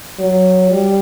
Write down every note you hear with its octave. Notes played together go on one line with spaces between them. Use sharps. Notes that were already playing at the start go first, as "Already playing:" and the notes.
F#3
G3